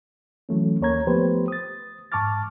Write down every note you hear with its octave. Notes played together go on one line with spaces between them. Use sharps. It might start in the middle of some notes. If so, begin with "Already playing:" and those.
E3 F#3 A3 C#4
D#2 A#3 C#5 A#5 G#6
F3 A3 B3 G4 B4 C5
D#6 A6
G#2 A5 C#6 D6 F6 A6